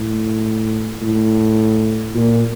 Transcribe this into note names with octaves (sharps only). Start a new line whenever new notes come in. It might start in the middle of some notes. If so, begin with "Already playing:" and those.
Already playing: A2
A2
A#2